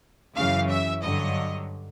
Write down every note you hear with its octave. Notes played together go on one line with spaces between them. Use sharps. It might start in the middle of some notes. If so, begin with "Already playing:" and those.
F#2 C#3 E3 F5
E5
G2 D3 F#3 D#5